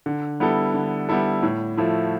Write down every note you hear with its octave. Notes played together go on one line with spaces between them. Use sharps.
D3
G3 B3 E4 A4
D3
G3 B3 E4 A4
A2
F3 A3 E4